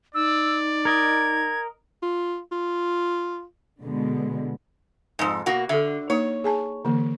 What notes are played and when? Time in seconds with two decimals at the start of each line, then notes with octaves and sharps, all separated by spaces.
0.15 D#4 D5 E6
0.85 A#4 D#5 G#6
2.03 F4
2.52 F4
3.82 B2 D3 G#3
5.19 F2 G#2
5.46 B2 A#3 F#4
5.69 D3 A4 E5
6.10 A#3 D#4 C#5
6.44 G#4 G#5 A5
6.85 D3 E3 A#3